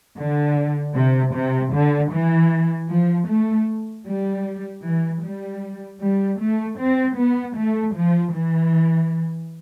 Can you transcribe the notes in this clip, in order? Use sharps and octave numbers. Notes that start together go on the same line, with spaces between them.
D3
C3
C3
D3
E3
F3
A3
G3
E3
G3
G3
A3
C4
B3
A3
F3
E3